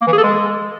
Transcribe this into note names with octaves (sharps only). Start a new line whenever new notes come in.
A#3
E3
G#4
A4
G#3